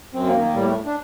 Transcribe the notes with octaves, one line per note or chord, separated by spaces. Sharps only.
F#2 C4
A#3
D#3
A#3
A2 G3
A#3
A3
D4